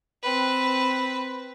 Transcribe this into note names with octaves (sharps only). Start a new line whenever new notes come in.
C4 B4